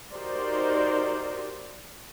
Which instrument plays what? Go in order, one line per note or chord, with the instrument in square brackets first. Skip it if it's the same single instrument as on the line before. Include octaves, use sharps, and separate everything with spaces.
[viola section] D#4 F#4 G4 A#4 C5 D5